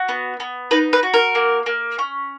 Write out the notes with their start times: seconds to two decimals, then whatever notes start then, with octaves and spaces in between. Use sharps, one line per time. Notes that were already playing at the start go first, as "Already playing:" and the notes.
Already playing: F#4
0.09 B3
0.40 B3
0.71 D#4 B4
0.93 B4
1.03 F#4
1.14 A#4
1.35 A#3
1.66 A#3
1.99 C#4